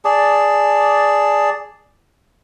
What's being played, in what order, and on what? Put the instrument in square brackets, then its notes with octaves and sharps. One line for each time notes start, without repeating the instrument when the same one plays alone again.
[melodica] G#4 D5 A5